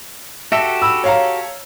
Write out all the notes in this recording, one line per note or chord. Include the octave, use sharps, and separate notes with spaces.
F#4 G4 A4 E5
B5 E6
C#5 F5 A#5